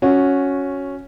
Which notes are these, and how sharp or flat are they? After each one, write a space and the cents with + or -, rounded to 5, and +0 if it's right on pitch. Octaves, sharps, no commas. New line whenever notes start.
C#4 +0 F#4 -10